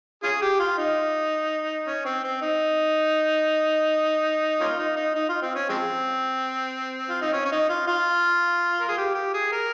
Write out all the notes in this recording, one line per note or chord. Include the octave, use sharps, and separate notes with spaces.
C#4 F4 G#4
G4
F4
D#4
C#4
C4
C4
D#4
A#3 C#4 F4
D#4
D#4
D#4
F4
C4
C#4
F3 G#3 C4
F4
D#4
C#4
C#4
D#4
F4
F4
A#4
G#4
G4
G4
G#4
A#4